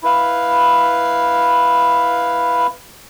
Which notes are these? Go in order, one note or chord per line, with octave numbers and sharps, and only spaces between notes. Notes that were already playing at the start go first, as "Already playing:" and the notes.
E4 B4 F5